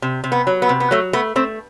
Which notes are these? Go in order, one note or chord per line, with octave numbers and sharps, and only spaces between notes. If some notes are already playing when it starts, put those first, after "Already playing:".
C3
C3
B3
F#3
B3
C3
B3
F#3 A3
A3 B3
A3 C4